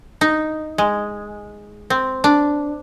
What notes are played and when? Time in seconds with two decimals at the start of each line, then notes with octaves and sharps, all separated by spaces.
0.21 D#4
0.78 G#3
1.90 C4
2.24 D4